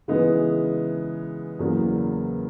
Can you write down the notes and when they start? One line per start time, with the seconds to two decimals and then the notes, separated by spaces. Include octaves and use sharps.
0.08 C#3 E3 G#3 B3 D#4
1.59 E2 C#3 F#3 A#3